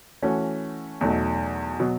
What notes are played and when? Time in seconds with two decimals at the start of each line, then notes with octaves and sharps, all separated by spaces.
0.22 E3 A3 C#4 F#4
1.01 E2 B2 F#3 A3 D#4
1.80 B2 F#3